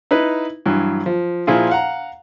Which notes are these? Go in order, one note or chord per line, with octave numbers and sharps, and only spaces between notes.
D#4 E4 B4
G2 E3 F#3
F3
A#2 F3 E4 F4 G#4
F5 F#5 A#5